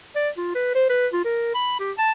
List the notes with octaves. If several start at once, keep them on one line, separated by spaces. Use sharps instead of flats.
D5
F4
B4
C5
B4
F4
A#4
B5
G4
A5